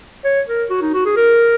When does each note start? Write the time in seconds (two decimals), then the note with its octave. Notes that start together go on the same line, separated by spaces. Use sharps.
0.25 C#5
0.48 A#4
0.70 F#4
0.82 D#4
0.94 F#4
1.06 G#4
1.17 A#4